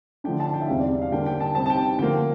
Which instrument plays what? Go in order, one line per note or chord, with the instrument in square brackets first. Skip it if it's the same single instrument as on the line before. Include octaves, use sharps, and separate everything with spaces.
[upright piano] D3 F3 A3 D4 G5
A5
G5
E5
E2 C3 G3 C4 F5
D5
F5
D3 G3 A#3 D4 G5
G5
A5
C3 G3 C4 A5
A5
G5
D3 F3 A#3 G5